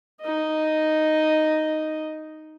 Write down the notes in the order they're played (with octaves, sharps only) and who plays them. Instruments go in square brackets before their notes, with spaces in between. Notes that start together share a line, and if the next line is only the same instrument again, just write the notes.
[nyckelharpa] D#4 D#5